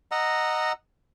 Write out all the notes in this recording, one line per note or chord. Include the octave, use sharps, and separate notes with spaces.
D#5 F#5 A#5 E6